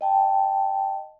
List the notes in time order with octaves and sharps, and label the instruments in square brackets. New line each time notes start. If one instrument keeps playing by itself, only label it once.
[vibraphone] D#5 G5 A5